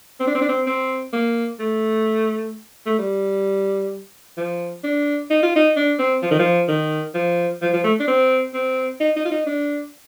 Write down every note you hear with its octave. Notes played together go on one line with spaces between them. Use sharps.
C4
D4
C4
D4
C4
C4
A#3
A3
A3
G3
F3
D4
D#4
F4
D#4
D4
C4
F3
D#3
F3
D#3
F3
F3
F3
A3
D4
C4
C4
D#4
D#4
F4
D#4
D4